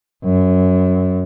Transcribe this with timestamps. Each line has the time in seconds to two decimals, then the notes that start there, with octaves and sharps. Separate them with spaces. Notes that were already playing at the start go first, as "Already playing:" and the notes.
0.24 F#2